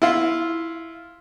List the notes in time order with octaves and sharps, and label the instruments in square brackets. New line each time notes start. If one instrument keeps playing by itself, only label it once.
[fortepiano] E4 F4